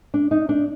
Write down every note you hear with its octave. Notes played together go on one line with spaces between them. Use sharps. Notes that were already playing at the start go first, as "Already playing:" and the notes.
D4
D#4
D4